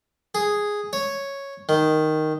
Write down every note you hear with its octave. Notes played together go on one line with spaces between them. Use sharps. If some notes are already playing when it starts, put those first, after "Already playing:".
G#4
C#5
D#3